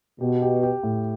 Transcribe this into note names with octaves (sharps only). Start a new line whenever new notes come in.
B2 G4
G4
G4
A2